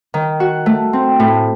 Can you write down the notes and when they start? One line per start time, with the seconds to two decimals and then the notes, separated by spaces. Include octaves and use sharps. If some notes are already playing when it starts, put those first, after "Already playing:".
0.14 D#3
0.40 F#4
0.66 A3
0.93 C4
1.20 A2